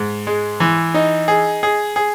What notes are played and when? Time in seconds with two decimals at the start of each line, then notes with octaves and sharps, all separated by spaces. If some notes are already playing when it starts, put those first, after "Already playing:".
Already playing: G#2
0.27 G#3
0.60 E3
0.94 D#4
1.28 G#4
1.63 G#4
1.96 G#4